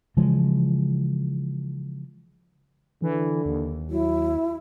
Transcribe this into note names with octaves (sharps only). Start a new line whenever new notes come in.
C#3 E3 F3 G#3
D3 E3
D#2
F#3 E4